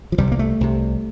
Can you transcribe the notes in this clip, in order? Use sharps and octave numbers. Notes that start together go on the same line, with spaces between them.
F3
C2 C3 G3
A#3
A3
C2 C3